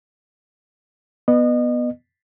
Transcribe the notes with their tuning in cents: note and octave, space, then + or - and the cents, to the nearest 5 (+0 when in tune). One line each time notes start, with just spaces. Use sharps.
B3 -10 D#5 -35